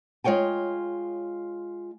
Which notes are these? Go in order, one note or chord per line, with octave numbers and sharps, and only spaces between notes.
G#3 F4 C#5 G5 G#5